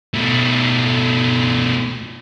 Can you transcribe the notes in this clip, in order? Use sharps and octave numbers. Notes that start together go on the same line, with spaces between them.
B2 A3